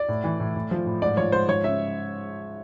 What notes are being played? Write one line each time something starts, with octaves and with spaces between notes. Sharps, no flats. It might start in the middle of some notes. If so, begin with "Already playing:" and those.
Already playing: D5
A2
E3
A2
A2
F3
A2
G#2 D5
F3 C#5
G#2 C5
F3 C#5
C#3 E5